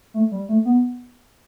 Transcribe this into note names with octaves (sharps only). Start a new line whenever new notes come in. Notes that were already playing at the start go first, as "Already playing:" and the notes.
A3
G3
A3
B3